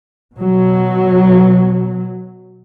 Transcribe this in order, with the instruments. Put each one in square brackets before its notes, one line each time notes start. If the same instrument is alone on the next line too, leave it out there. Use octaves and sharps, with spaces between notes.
[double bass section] B2 F#3